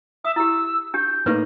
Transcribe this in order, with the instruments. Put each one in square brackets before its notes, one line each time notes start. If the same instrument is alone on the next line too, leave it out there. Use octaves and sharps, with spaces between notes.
[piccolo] E5 [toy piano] D#6
[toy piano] E4 G4 [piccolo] E6
[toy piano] D4 G4 [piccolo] G6
[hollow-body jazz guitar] A2 A#3 D#4 [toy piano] B4 C#6